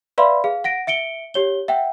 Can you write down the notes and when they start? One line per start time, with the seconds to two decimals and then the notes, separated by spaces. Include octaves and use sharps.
0.18 B4 D5 E5 F5 B5 C6
0.44 G#4 F5
0.64 F#5 A#6 D7
0.87 E5 C#7 D7 G7
1.34 G4 C#5 G7
1.68 E5 F#5 G5